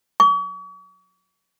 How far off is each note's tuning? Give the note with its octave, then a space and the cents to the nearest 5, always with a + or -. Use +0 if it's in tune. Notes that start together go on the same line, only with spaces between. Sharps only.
C#6 +45